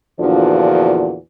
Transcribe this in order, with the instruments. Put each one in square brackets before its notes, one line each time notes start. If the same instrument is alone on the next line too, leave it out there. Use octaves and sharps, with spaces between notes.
[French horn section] E2 A#2 D3 F3 D4 F#4